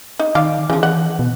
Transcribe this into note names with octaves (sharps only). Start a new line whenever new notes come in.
D#4
D#3 D5 F5
C#3 E3 F3
F#5
B2